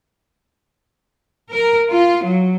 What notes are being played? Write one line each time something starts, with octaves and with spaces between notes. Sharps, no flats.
A#4
F4
F#3